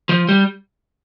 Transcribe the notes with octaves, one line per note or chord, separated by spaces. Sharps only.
F3
G3